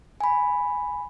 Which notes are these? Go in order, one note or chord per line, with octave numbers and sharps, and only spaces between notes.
G#5 B5